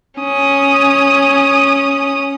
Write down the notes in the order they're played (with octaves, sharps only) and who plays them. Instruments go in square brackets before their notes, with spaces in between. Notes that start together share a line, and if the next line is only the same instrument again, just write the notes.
[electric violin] C#4 D#6